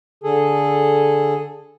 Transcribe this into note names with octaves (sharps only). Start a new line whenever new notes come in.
D3 G#4 A4